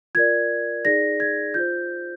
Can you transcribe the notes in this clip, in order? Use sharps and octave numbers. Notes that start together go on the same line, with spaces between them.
F4 A#4 D5 G#6
D#4 G#4 D5 A#6
G#6
F4 C5 G6